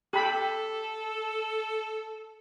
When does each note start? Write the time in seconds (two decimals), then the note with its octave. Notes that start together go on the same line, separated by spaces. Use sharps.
0.13 G4 A4 B5